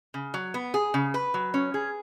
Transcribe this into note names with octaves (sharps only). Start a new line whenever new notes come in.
C#3
F#3
B3
G#4
C#3
B4
F#3
C#4
G#4